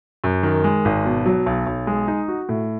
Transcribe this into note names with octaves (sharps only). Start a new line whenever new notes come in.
F#2
D#3
G#3
G#1
B2
F#3
B1
B1
G#3
D#4
F#4
A2